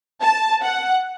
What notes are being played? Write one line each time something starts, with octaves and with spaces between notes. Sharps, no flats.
A5
F#5